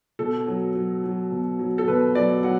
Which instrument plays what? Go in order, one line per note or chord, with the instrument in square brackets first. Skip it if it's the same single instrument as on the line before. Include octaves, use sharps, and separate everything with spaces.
[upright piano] B2 A4
F#3
F#3
F#3
B2
F#3
A4
B2 B4
F#3 D5
F#3 F#5